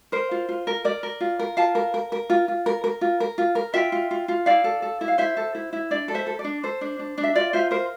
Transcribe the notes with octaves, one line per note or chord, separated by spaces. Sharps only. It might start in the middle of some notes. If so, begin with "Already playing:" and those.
A#4 C5
F4
F4
A#4
A#4 D5
A#4
F4
A#4
F4 F5 A5
A#4
A#4
A#4
F4
F4
A#4
A#4
F4
A#4
F4
A#4
F4 E5 G5
F4
F4
F4
E4 D5 F5
A4
A4
E4
F5
E4 C5 E5
A4
E4
E4
D4 D5
A4
C5 E5
A4
D5
D4
A4 C5
D4
D4
D4
E5
F4 D5
F4 C5 E5
A#4 C5